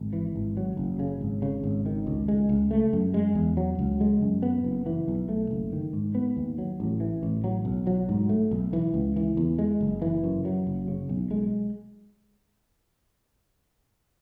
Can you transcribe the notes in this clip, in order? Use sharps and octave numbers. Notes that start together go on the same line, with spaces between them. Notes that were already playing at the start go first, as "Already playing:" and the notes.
Already playing: G#1
E3
G#1
F#3
F#1
C#3
G#1
C#3
G#1
D#3
C#2
G#3
C#2
A3
F#2
G#3
E2
F#3
C#2
G#3
F#2
B3
F#1
E3
B1
A3
F#1
D#3
G#2
B3
D#2
F#3
A1
E3
A1
F#3
B1
F#3
G#2
A3
B1
E3
C#2
E3
E2
G#3
F#1
E3
F#2
F#3
F#1
C#3
B1
G#3